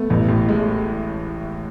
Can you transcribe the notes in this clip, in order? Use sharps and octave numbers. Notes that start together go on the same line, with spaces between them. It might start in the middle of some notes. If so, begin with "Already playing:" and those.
Already playing: A3 B3
A1
A2
G#3